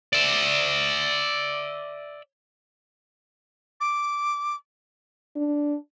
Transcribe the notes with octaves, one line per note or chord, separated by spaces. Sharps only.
D5 E5
D6
D4